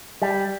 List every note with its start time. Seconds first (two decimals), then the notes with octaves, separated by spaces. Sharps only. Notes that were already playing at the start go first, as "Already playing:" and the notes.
0.22 G3